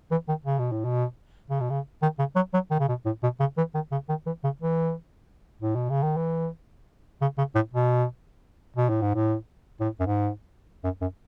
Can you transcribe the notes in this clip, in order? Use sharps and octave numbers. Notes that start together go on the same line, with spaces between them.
E3
D#3
C#3
B2
A2
B2
C#3
B2
C#3
D#3
C#3
F#3
F#3
D#3
C#3
B2
A2
B2
C#3
E3
D#3
C#3
D#3
E3
C#3
E3
A2
B2
C#3
D#3
E3
C#3
C#3
A2
B2
B2
A2
G#2
A2
A2
F#2
G#2
F#2
F#2